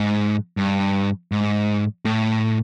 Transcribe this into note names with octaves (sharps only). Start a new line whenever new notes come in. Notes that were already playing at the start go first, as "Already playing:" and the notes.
Already playing: G#2
G2
G#2
A2